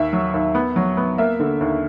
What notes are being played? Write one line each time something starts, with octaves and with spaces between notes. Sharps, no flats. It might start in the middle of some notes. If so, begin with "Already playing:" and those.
Already playing: D#2 E5
F#3
D#2
B3
F#3
B3
A#3 E5
D3
D#2